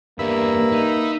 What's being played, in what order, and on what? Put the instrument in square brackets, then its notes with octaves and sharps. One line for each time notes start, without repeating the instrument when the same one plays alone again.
[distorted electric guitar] E2 [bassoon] G2 [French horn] A#3 [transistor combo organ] E5 B5
[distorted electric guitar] D#4